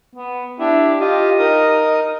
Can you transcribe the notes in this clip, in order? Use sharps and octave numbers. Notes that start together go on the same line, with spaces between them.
B3
D4 E4 G4
F4 G4 D#5
D#4 A#4 D#6